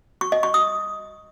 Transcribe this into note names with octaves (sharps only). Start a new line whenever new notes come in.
C#6
D#5
C#6
D#6